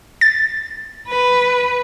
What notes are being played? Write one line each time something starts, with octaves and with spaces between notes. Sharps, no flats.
A6
B4